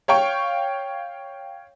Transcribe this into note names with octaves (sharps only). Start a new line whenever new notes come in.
C#5 F5 G5 C#6